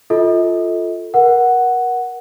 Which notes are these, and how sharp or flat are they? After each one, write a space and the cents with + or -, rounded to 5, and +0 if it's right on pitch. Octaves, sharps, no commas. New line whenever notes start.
F4 +0 A4 +0 D#5 +40
A#4 +30 F#5 +0